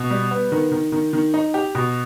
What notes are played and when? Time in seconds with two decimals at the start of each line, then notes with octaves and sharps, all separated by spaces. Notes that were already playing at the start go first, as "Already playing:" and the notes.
Already playing: B2
0.10 G3
0.31 B3
0.52 D#3
0.72 D#3
0.92 D#3
1.13 D#3
1.34 D#4
1.54 G4
1.75 B2